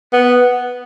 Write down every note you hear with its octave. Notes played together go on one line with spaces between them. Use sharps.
B3